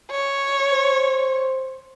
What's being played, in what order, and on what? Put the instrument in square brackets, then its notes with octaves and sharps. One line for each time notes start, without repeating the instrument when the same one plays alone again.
[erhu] C#5
[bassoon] C5